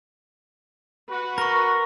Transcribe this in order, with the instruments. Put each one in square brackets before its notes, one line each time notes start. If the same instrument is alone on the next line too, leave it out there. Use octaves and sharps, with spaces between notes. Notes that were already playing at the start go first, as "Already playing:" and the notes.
[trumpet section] F#4 [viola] B4
[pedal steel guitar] A#4 [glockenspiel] C#6 A#6